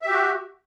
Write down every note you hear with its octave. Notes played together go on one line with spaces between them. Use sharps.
F#4 G4 E5